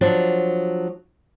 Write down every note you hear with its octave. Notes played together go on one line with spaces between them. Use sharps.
F3 F#3 D4